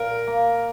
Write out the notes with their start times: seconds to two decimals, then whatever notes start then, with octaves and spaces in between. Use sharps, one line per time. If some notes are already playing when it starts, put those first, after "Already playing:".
Already playing: A#2 A#4
0.27 A#3